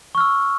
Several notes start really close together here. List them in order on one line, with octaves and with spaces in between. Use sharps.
C#6 F6 E6